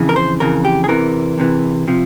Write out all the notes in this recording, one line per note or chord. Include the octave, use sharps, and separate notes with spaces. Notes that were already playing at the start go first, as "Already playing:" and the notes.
Already playing: F2 C#3 E3
A#4
C5
F2 C#3 E3 A#4
G4
G#4
E2 C3 E3 A#4
E2 C3 E3
C3 F3